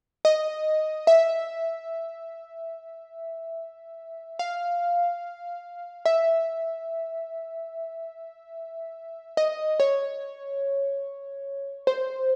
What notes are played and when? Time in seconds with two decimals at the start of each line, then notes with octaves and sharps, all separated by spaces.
0.25 D#5
1.07 E5
4.39 F5
6.06 E5
9.37 D#5
9.80 C#5
11.87 C5